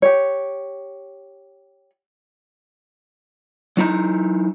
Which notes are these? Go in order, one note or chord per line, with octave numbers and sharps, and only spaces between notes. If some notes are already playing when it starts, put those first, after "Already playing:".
G4 C#5
F#3 D#4 E4 A#5